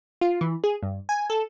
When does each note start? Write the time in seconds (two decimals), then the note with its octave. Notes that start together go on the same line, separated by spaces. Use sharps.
0.21 F4
0.41 E3
0.64 G#4
0.83 G2
1.09 G#5
1.30 A4